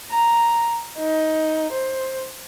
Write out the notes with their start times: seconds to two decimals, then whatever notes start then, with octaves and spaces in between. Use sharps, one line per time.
0.11 A#5
0.99 D#4
1.73 C5